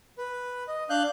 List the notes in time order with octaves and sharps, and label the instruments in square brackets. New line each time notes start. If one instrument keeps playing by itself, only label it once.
[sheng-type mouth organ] B4
D#5
D4 F5 F#6 G6